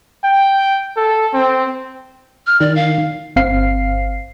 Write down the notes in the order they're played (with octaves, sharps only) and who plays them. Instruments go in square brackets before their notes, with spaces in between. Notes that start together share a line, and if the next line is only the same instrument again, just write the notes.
[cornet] G5
A4
C4
[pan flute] F6
[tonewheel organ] D#3 [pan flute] D5
[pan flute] F5
[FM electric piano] G1 C4 F5 C7